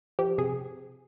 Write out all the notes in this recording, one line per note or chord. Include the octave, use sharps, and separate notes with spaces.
F3 G4
C3 G#4